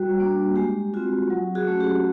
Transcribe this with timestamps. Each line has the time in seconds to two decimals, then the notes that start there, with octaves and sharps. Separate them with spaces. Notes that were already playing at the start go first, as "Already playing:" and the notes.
Already playing: G3 F#4
0.20 A#3 D4
0.56 G#3 G4
0.94 C4 F4 F#4
1.30 F#3
1.55 F#4 G#4
1.67 A3 C#4
1.80 G4